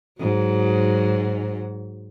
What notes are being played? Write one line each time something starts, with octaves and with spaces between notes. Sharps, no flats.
G#2 F#3 F#4